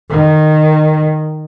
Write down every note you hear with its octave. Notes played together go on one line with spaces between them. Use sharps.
D#3